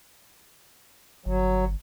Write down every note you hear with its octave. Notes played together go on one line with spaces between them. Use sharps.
G1 F#3